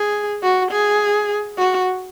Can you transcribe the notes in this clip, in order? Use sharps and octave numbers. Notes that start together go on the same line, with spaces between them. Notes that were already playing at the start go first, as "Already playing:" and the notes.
Already playing: G#4
F#4
G#4
F#4